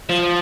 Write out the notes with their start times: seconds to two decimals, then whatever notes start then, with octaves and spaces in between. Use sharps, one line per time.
0.09 F3